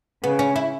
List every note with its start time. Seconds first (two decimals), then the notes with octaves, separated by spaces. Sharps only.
0.23 C#3 B3
0.39 C#4
0.56 E4